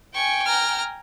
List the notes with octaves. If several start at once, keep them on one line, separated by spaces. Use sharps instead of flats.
G5 G#5 C#6
A#5 F6